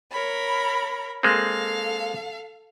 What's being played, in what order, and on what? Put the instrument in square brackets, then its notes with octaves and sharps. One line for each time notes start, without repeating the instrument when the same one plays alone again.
[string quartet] A#4 C#5 B5
[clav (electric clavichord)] G#3 A#3 C4 [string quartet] A4 F5